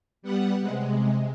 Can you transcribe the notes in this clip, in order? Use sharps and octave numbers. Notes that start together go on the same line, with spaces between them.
G3 B3 F#5
C3 G#3